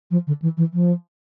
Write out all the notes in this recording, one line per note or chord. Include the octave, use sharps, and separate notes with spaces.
F3
D3
E3
E3
F3